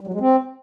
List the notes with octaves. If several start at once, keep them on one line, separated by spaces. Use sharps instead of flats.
G3
F#3
G#3
C4